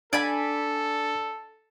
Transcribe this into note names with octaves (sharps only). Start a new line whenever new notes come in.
D4 A4 D5 G#5 B5